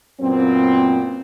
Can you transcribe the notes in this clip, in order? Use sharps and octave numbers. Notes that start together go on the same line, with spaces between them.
F#2 A#2 B3 C4